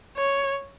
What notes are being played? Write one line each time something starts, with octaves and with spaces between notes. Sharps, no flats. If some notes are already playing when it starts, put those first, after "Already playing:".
C#5